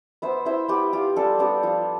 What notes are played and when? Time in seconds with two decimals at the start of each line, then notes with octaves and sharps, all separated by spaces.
0.22 B3 C5 E5
0.45 E4 C5 E5
0.68 B3 G4 B4
0.93 F4 G4
1.16 G3 F4 A4
1.39 B3 D4 G4
1.63 F3 F4